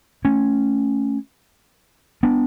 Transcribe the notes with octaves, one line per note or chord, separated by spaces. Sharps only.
A3 C#4
B3 D4